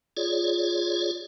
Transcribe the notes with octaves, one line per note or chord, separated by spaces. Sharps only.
F4 G#4 C#5 D5